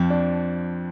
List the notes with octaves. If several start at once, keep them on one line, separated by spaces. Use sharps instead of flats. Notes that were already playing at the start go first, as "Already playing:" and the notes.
Already playing: F2 F3
D4